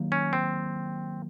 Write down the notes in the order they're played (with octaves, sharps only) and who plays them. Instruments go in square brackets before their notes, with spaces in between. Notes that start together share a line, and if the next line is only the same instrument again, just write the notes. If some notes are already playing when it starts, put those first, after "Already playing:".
Already playing: [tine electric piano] D#3 F#3 A#3
[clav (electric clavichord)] C#4
C4